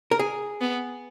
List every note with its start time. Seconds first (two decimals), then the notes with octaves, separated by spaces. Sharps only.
0.11 A#4
0.19 G#4
0.61 B3